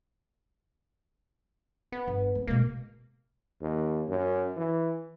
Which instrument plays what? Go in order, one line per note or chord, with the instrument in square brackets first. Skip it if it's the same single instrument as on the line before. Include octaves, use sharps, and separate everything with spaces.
[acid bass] B3
[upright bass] G1
A3
[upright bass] B2 G#3 [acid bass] A#3
[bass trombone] D#2
F#2
E3